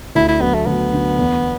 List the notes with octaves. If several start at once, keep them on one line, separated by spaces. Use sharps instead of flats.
D2 E4
E4
D3 F#3 B3
A3
D2 B3
D3 F#3
E2